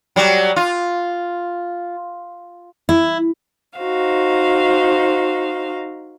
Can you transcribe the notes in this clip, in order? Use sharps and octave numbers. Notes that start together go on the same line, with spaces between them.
F#3 G3
F4
E4
D#4 F#4 C5 F5